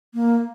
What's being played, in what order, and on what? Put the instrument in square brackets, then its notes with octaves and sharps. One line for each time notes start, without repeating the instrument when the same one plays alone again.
[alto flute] A#3